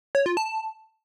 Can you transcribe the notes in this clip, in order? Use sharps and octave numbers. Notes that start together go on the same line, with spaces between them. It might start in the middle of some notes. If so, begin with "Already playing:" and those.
C#5
F4
A5